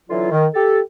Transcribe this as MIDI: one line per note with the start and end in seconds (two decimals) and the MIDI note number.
0.09 0.30 50
0.09 0.30 52
0.09 0.30 54
0.09 0.30 65
0.31 0.46 51
0.54 0.79 67
0.54 0.79 69